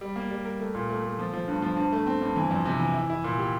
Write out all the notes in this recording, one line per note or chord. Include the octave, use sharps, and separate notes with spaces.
G3
A#3
G3
A#4
A3
A#2
A3
A3
F3
F3
G2
F3
G2
A3
C4
G2
E3
F2
C3
E3
E4
E4
A#2
G4